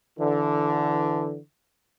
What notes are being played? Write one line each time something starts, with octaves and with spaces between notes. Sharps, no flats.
D3 E3